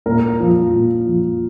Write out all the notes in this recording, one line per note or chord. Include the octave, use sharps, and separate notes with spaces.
A#2 A#4
F3
A#2
F3